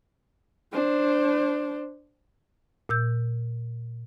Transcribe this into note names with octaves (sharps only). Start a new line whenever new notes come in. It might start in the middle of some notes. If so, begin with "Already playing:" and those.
D4 C5
A#2 E6 G6